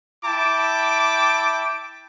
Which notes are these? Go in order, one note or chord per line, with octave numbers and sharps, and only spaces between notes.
E4 G5 A5 D6